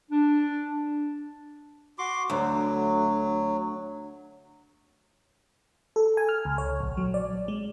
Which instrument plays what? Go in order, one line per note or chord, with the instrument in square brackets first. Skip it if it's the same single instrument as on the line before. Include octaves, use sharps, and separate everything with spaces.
[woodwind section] D4
[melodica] F#4 C6 D6
[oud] D2 [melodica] F#3
[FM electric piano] A4
G#5
F6
C#2
C#5
A#1
F#3
D5
G#3